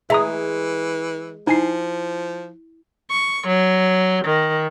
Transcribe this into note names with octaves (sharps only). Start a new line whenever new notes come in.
E3 G#3 E5 A#5 D#6
F3 D#4 E4 G#5 C7
C#6
F#3
D#3